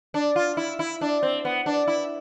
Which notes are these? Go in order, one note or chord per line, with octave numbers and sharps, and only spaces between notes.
D4
F4
E4
E4
D4
C4
B3
D4
E4